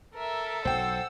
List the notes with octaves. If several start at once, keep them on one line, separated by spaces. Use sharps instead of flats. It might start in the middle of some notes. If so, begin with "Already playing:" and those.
A4 A#4 E5
B1 F#3 C5 F#5 G5 E6